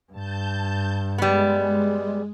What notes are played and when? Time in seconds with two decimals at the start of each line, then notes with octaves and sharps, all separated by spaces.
0.12 G2 A5 G6
1.18 G3 G#3 B3